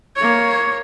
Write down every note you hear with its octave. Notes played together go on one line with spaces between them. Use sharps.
A#3 C#5